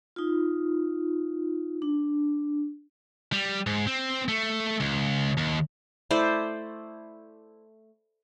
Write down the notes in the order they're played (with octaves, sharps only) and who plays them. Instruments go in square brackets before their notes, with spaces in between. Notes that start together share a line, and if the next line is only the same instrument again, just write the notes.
[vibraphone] D#4 F4
D4
[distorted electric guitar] G3
G#2
C4
A3
C#2
D#2
[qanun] A3 E4 C5 D5